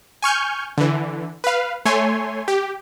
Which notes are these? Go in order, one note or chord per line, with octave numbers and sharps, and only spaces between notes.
G#5 C#6 F6 G6
D3 E3
B4 F5
A3 C#5 G#5 C6
G4